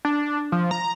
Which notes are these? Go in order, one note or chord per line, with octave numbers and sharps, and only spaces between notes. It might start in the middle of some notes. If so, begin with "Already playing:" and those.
D4
F3
A#5